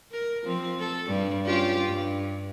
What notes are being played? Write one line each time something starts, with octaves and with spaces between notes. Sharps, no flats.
A#4
F3 C4
A4
G2 G3
C#4 F4 G4
G2